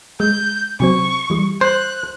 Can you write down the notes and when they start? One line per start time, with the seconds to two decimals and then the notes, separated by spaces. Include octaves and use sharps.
0.20 G#3 G6
0.80 C3 F#3 C4 C#6
1.30 E3 G3
1.61 C5 F#6